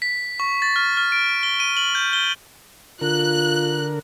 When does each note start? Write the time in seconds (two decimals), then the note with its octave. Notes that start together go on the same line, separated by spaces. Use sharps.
0.02 B6
0.40 C#6
0.62 A6
0.76 F6
0.97 F6
1.12 D7
1.43 G7
1.60 D#7
1.77 F#7
1.95 G6
2.13 G7
3.01 D3 F4 A#4 F#6